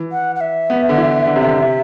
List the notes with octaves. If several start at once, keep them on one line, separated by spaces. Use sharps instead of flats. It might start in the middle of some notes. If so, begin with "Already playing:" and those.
Already playing: E3
F#5
F#5
E5
B3
D3
E3
D3
C3
D3
C3